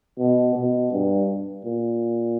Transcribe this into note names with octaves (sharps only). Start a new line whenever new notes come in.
B2
B2
G2
A#2